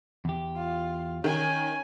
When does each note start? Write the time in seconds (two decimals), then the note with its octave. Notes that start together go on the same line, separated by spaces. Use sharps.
0.25 E2 G4
0.57 F4
1.24 D#3 C#4 G#5